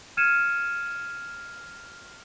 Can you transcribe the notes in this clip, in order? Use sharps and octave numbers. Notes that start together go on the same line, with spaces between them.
F6 G#6 C#7 D#7 E7